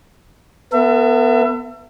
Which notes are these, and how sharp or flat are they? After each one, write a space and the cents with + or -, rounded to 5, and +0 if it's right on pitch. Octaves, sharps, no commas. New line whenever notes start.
B3 +0 A4 +45 E5 +30